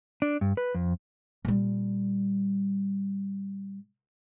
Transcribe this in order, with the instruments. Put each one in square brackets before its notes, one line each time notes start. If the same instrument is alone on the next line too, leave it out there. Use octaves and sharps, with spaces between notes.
[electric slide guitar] D4
G2
B4
F2
[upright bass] A#2 G3